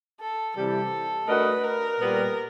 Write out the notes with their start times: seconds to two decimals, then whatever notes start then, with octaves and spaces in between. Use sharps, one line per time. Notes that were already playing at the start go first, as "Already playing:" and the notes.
0.20 A4
0.56 C3 E3 G3 A4
1.28 A3 D4 F#4 A#4 B4 D#5
1.64 A#4
2.00 A#2 G3 B3